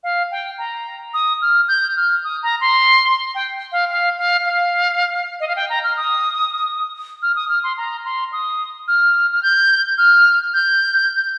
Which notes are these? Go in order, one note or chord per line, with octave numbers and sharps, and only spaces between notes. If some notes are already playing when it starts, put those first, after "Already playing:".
F5
G5
A#5
D#6
F6
G6
F6
D#6
A#5
C6
G5
F5
F5
F5
F5
D#5
F5
G5
A#5
F6
D#6
F6
D#6
F6
C6
A#5
C6
D#6
F6
F6
G6
F6
G6